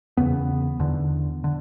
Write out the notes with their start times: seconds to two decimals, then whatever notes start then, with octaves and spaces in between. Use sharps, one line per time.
0.17 E2 C#3 B3
0.79 E2 D3
1.44 D3